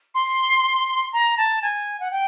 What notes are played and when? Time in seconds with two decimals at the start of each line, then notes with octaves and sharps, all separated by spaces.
0.14 C6
1.12 A#5
1.37 A5
1.62 G#5
2.00 F#5
2.11 G5